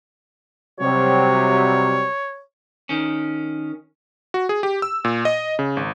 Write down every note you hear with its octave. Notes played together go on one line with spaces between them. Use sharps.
C3 F#3 G3 C#5
D#3 C#4
F#4
G#4
G4
E6
A#2
D#5
C#3
G#1